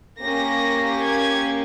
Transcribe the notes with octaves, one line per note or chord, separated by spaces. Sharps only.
A#3 C#4 G4 A#6
G#6